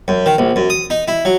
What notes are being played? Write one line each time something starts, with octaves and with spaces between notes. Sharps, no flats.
F#2
D#3
A#1
F#2
D#6
D#4
E4
F#3